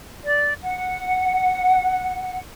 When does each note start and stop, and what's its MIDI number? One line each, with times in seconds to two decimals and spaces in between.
0.24 0.52 74
0.62 2.40 78